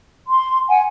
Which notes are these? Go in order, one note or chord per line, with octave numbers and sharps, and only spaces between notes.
C6
F#5 G#5